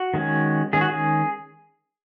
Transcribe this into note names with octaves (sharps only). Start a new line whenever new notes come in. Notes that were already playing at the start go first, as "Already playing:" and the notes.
Already playing: F#4
D#3 G#3 C#4
D#3 G#3 C#4 G#4
F#4
G#4